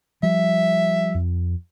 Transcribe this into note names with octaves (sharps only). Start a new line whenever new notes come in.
F3 G3 E5
F2